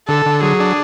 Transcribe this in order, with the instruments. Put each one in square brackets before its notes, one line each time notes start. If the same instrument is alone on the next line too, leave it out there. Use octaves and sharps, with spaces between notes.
[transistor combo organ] D3 [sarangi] A4
[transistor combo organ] D3
[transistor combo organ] F#3 [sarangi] G#4
[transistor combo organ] D4